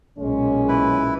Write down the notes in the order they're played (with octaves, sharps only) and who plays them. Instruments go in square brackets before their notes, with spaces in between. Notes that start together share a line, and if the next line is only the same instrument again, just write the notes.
[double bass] B1 A#2 [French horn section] G#3 C#4
[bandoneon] E3 E4 B4